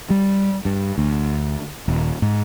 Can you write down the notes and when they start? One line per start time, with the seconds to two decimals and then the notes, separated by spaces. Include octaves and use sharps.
0.10 G3
0.65 G2
0.98 D2
1.88 D#1
2.22 G#2